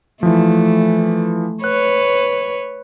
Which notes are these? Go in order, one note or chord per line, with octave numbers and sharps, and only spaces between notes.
E3 F3 A3
B4 C#5 F#6